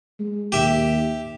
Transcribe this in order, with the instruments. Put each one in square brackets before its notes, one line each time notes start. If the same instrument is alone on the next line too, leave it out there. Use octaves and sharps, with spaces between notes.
[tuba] G#3
[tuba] D#2 [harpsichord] G4 E5